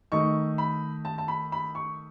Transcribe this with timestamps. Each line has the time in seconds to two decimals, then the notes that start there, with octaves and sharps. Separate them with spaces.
0.12 D#3 A3 D#4 C#6
0.58 B5
1.05 A5
1.18 A5
1.28 B5
1.52 B5
1.75 C#6